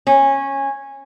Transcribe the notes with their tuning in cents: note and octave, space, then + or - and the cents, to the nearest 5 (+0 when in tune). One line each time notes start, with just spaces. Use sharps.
C#4 -15